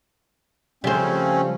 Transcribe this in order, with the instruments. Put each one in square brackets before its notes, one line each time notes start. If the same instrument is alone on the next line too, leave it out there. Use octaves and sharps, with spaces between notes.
[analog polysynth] C#3 F3 [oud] G3 C5 [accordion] A3 C4 C#4